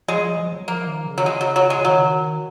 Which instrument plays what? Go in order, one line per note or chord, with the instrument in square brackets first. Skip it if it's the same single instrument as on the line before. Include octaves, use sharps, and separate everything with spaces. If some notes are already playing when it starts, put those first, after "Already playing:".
[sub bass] F3 [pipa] G#3
[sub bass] F#3
F3
F3
F#3
[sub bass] F3 [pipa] A#3
[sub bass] D#3
C#3
[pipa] F#3
G#3
F#3
F#3
G#3
[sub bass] C#3
[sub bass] D#3 [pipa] F#3